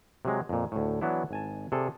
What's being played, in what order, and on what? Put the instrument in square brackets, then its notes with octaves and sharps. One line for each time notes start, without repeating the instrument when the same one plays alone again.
[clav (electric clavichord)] C3 F#3 G#3
F2 A#2
D2 A2
E3 F#3 B3 D4 E4
G#1 G#5 A5
C3 G#4 A4 D5